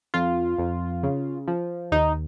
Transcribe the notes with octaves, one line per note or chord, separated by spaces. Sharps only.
F2 F4
F2
C#3
F3
D#2 D#4